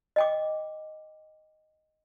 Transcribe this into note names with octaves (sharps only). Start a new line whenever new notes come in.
D#5 G5 D6